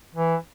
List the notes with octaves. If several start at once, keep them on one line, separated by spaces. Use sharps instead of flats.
E3